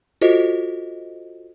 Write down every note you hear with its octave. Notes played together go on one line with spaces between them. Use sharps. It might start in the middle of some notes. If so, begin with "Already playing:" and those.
F4 F#4 A4 C5 D#5